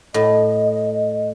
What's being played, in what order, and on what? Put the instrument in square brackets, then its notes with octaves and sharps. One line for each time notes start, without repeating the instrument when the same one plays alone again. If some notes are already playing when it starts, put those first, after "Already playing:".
[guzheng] A2 [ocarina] D#5